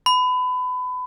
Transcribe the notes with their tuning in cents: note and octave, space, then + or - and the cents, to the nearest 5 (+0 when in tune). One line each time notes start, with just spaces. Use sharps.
B5 +30